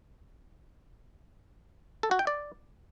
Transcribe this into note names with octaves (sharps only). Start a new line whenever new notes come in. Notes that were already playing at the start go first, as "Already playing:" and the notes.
A4
F#4
G5
D5